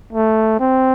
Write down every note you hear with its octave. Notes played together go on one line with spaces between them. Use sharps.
A3
C4